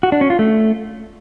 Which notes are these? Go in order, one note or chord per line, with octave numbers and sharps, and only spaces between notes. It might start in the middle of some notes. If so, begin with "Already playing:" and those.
F#4
D4
C#4
F4
A3